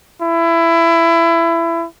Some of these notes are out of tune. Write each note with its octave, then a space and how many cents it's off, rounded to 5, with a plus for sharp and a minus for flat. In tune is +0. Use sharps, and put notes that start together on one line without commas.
E4 +20